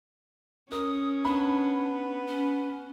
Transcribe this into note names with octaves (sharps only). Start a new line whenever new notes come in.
C#4 A#4 D#6
B3 D4 B5
C#4